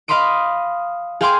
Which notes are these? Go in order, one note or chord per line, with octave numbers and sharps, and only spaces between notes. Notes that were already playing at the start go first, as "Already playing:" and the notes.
D#5 F5 B5 C6 D#6 D7
G#4 F5 G5 G#5 C6 D6